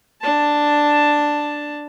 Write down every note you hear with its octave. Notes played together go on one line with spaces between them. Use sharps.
D4 A5